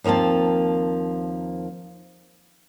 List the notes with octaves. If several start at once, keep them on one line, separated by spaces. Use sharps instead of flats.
D#2 F3 A#3 C4 A5